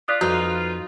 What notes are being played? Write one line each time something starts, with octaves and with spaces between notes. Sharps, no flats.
F4 D5 D#6 F#6 B6
F2 D#4 F4 F#4 B4